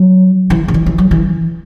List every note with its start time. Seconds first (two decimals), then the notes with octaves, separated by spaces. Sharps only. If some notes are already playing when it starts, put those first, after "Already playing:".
Already playing: F#3
0.50 E3
0.68 D3
0.74 E3
0.86 E3
0.98 F#3
1.11 E3